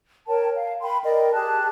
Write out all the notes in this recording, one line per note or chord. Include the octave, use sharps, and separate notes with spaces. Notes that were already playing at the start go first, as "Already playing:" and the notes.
A#4 C#5 G5 A5
F5
A#4 G5 B5 C6
A#4 D5 D#5 G5
G4 G#4 A5 F#6